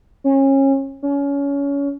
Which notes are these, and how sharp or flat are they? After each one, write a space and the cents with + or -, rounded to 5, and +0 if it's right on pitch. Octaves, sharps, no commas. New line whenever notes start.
C#4 -30
C#4 +25